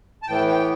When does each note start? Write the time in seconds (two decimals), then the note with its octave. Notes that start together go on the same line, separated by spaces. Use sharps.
0.23 A5
0.27 A2 E3 B3 G5
0.48 G5